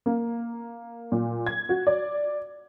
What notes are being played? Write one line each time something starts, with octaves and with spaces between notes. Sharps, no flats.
A#3
A#2
G#6
F#4
D5